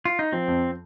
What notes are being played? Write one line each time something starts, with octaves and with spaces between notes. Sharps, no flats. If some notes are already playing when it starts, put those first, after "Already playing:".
F4
D#4
F3 C4
F2